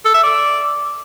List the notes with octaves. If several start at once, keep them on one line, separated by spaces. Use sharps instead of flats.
A4
E5
D5